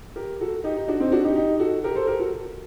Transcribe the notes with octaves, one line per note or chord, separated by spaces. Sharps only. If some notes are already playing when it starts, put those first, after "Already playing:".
G4 A#4
F#4 A4
D#4 G4
D#4
D4 F#4
C4 D#4
D4 F#4
D#4 G4
D#4 G4
F#4 A4
G4 A#4
A4 C5
G4 A#4
F#4 A4